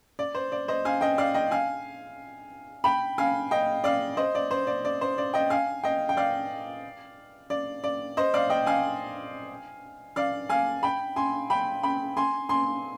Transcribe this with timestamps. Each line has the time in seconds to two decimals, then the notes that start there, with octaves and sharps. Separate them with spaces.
0.19 D5
0.35 C5
0.52 D5
0.68 C5 D#5
0.85 F5 G#5
1.01 D#5 G5
1.18 D5 F5
1.34 D#5 G5
1.51 F5 G#5
2.84 G5 B5
3.18 F5 G#5
3.51 D#5 G5
3.84 D5 F5
4.17 C5 D#5
4.35 D5
4.51 C5
4.67 D5
4.85 D5
5.01 C5
5.18 D5
5.34 D#5 G5
5.50 F5 G#5
5.84 D#5 G5
6.09 G5
6.17 D5 F5
7.50 D5
7.84 D5
8.17 C5 D#5
8.34 D5 F5
8.50 D#5 G5
8.66 F5 G#5
10.16 D5 F5
10.49 F5 G#5
10.83 G5 B5
11.16 G#5 C6
11.50 G5 B5
11.83 G5 B5
12.17 G#5 C6
12.49 G#5 C6